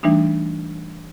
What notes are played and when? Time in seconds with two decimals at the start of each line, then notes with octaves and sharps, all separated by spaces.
0.03 E3 G3 A3 D4 D#4